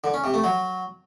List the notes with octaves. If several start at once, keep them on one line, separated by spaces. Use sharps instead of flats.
D3
C#4
C3
A3
F#3